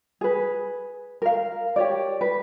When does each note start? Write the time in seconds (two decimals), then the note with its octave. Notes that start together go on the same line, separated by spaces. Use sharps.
0.21 G#4 B4
1.22 A#4 F5
1.76 G4 C#5 D5
2.21 B4